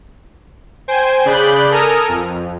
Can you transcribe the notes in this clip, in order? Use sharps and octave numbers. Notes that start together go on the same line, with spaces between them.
C5 G5 G#5
C#3 G#4 D5 B5 F#6 G6
A4 A#4 G#5 A#5 D#6 F6
F2